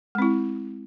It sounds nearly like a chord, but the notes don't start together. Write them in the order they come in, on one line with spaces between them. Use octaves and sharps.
G#3 C4 E4